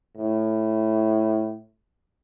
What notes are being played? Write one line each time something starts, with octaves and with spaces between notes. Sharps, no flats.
A2